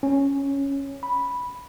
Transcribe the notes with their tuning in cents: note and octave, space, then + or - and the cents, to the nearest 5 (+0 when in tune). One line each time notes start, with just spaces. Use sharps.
C#4 +0
B5 -5